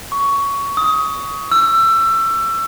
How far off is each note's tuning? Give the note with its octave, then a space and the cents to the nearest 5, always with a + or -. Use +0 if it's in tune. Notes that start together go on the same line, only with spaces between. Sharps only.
C#6 +15
D#6 +25
E6 +25